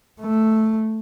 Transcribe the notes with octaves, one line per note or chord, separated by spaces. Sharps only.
A3